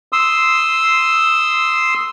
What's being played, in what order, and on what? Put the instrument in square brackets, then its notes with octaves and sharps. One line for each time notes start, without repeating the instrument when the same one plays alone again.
[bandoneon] C6 D#6 E6